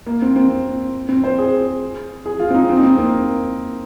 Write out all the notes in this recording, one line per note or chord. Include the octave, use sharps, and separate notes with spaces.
A#3
C4
C4
C4
C5
G#4
G#4
F4
C4
D#4
C4
D#4
C4
A#3